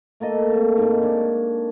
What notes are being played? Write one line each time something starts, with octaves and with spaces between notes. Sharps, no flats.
A3 A#3 A4 D#5
C4 E5
G#2 G#3
D4 C#5